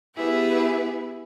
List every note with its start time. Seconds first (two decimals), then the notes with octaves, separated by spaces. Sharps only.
0.15 B3 E4 G4 G#4 B4